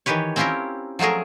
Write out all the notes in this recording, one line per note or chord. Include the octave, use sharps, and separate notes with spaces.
D#3 E3 G4 B4 C#5
C4 C#4 E4 F4 G4 A#4
F3 F#3 A3 G#4 A#4